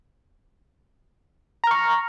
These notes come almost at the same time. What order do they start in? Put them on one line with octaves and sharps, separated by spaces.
A#5 F6 C#6